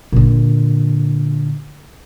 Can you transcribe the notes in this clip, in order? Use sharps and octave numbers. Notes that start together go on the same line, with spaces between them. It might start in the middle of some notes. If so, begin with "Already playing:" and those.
A#2 D3